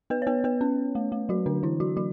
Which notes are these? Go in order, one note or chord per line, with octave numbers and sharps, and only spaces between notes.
B3 B4
C#5
B3 B4
B3 B4
C#4
A3
A3
F#3 F#4
D3 D4
E3 E4
F#3 F#4
F#3 F#4